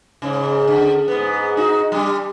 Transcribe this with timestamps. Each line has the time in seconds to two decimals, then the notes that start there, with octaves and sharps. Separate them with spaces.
0.22 G#2 C#3
0.67 D3
1.08 G#2 B3
1.57 D#4 F#4
1.92 G3 D4